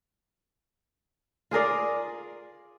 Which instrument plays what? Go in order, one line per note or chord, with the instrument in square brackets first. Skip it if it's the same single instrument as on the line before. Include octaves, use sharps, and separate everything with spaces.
[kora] F4 G#4 A#4 D5